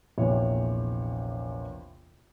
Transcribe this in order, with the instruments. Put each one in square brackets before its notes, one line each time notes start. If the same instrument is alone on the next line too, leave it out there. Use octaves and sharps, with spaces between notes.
[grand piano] A#1 E2 C3 C#5